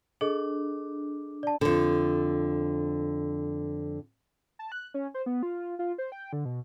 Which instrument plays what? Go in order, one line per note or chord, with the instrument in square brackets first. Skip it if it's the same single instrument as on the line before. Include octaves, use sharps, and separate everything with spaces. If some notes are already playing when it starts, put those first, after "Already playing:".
[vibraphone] D4 [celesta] G#4 A4 D#5
[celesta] D5 A5
[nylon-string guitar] F2 D3
[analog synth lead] A5
F#6
C#4
C5
B3
F4
F4
C5
G5
D3
B2